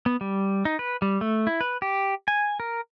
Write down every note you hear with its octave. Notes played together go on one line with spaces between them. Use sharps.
B3
G3
D#4
B4
G3
A3
E4
B4
G4
G#5
A#4